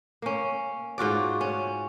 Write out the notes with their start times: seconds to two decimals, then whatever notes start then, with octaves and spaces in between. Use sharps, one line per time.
0.22 A#3 C#4
0.98 G#2 F4 F#4 D5
1.41 C#4